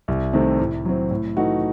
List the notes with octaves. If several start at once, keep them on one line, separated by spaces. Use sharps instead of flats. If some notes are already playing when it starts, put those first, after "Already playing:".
C2
C3 D#3 A3 C4
A2
F#3 C4
A2
E3 A3 D#4 F#4